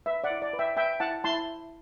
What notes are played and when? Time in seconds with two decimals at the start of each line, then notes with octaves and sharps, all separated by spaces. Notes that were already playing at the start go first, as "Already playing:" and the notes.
0.06 B4 E5
0.24 D5 F#5
0.30 E4
0.42 D5
0.53 B4
0.59 E5 G5
0.76 B4 E5 G5
1.00 E4 F#5 A5
1.24 E4 A5 C6